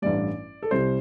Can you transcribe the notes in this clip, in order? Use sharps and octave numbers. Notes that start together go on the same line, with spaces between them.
A1 G2 E3 G3 D5
A4
C2 C3 G3 C5